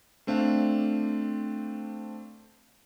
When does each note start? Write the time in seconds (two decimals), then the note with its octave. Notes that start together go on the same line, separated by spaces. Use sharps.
0.27 A3 C4 D4 F5